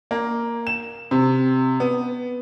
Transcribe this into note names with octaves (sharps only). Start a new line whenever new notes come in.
A#3
E7
C3
B3